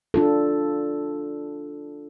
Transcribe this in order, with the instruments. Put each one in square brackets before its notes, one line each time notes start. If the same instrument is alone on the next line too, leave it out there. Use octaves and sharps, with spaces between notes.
[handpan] D4 F4 A4